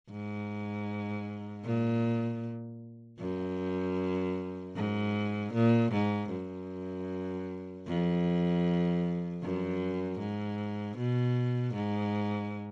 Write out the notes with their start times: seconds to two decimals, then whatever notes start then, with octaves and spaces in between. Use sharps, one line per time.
0.10 G#2
1.65 A#2
3.20 F#2
4.76 G#2
5.54 A#2
5.93 G#2
6.31 F#2
7.87 F2
9.43 F#2
10.20 G#2
10.98 B2
11.75 G#2